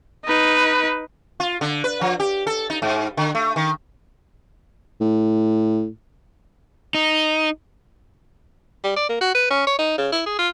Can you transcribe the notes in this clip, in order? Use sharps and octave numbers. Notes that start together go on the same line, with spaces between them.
D#4 B4
F4
D3
B4
F3
G4
A4
D#4
G#2
D3
A3
D#3
A2
D#4
G3
D5
A#3
F#4
B4
C#4
C#5
D#4
C#3
E4
G#4
F4